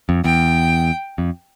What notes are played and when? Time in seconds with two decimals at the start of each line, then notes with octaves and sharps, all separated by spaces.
0.09 F2
0.24 E2 G5
1.18 F2